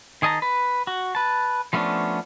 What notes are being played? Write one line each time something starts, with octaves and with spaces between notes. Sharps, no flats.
D#3 G#4 D#5 A5 A#5
B4
F#4
B4 A5
F3 A3 B3 C#4 D4